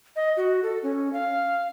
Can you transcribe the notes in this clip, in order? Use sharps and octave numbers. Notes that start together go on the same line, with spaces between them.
D#5
F#4
A4
C#4
F5